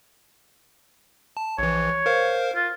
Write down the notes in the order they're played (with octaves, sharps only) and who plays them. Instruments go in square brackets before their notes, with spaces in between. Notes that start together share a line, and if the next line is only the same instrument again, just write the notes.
[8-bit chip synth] A5
[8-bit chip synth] A#1 E3 [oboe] C#5
[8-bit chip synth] A#4 C5 F5
[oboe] F4